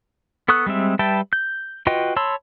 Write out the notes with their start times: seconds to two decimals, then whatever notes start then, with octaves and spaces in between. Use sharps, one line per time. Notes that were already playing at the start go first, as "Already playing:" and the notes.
0.48 B3 A4 C#6 D#6 F#6
0.66 G3 G#3 C4 E5
0.99 G3 B4 E5 G5 A5
1.33 G6
1.87 F4 F#4 B4 D#5 G5
2.16 C#5 A5 B5 C6 E6